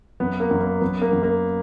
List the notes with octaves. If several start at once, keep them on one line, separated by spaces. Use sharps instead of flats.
F#2 B3
A#3
F#2
A#3
F#2 B3
A#3
F#2
A#3